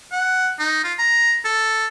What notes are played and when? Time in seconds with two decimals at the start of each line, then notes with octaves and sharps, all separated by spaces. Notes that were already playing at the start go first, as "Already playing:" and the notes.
0.12 F#5
0.59 D#4
0.84 F4
0.99 A#5
1.45 A4